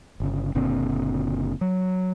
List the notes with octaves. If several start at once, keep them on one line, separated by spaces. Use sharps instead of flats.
G1 C#3
F#1 A#2 D3 C4
F#3